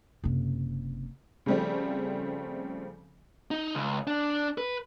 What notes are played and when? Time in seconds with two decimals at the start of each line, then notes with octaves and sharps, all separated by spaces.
0.24 F#1 C3
1.46 C#3 F3 G3 A3 C4
3.51 D#4
3.75 C#2
4.07 D4
4.58 B4